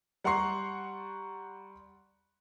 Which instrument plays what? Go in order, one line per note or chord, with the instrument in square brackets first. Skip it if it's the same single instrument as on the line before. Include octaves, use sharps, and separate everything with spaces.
[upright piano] G3 F#5 A#5 C6 C#6 C7